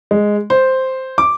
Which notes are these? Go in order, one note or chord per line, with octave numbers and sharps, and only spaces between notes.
G#3
C5
D6